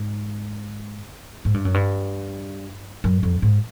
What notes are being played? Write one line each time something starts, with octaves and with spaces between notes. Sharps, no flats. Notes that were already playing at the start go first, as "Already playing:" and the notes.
Already playing: G#2
G#2
G2
F#2
G2
F#2
F2
G#2